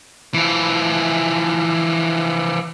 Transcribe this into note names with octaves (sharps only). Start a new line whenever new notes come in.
E3 F3